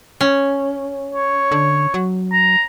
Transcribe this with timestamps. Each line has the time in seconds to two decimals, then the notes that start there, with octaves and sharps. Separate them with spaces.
0.21 C#4
1.14 C#5
1.51 D3
1.94 F#3
2.33 A#5